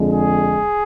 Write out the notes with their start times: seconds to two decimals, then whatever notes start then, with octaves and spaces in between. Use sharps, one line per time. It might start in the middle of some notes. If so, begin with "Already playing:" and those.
Already playing: F2 D3 G#3
0.09 G#4